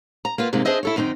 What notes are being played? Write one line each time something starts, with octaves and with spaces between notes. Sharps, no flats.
A#5
A#3 B3 F4
G#2 C3 G#3 A#3 C4
D4 G#4 C5 D#5 E5
E4 A4 C#5
F#2 D#3 C4 C#4 D#4